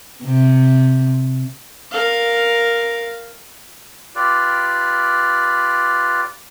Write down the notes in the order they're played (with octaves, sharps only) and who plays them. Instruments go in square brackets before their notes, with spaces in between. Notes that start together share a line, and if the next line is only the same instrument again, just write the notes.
[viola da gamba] C3
[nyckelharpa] A#4 F5
[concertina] F4 G4 B4 D5